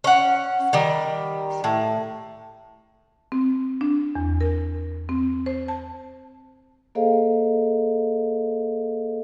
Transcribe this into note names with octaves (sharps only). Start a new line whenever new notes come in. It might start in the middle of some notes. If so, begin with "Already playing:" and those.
C#4 F#5
D#3 G3
A2
C4
D4
E2
A#4
C4
C5
A5
A#3 G#4 A4 C5 D#5 F5